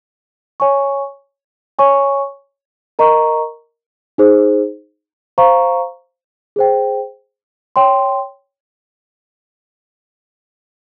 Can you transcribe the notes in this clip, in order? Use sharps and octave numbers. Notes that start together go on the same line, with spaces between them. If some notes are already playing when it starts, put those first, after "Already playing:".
C#5 G#5 C#6
C#5 G#5 C#6
A#4 D#5 A#5 C#6
D#4 G#4 C5
C5 F5 A#5 C#6
G#4 C5 G5
C#5 G5 C6